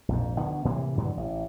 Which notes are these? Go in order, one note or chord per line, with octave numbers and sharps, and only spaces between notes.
A#1 F2 G#2
D2 D3 D#3 B3
A2 C3 E3 A#3
G2 D3 E3 F#3
A1